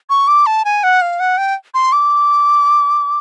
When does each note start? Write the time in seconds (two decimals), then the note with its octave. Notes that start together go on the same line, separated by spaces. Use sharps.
0.10 C#6
0.28 D6
0.46 A5
0.65 G#5
0.83 F#5
1.02 F5
1.20 F#5
1.38 G5
1.74 C6
1.92 D6